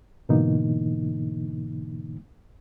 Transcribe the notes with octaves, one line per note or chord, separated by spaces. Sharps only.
G#2 B2 D3 E3 A#3 D#4